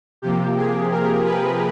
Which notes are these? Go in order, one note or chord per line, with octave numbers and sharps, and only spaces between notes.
C3 F3 A#3 G4
G#4
A#4
B4